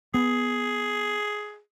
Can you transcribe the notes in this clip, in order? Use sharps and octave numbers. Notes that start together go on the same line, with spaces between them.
B3 G#4